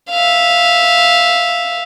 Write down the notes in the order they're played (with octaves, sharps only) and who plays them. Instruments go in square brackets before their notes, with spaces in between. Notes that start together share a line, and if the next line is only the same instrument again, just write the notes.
[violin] E5 F5